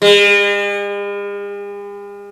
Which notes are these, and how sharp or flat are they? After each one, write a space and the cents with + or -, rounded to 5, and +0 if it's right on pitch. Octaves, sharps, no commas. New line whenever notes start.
G#3 -45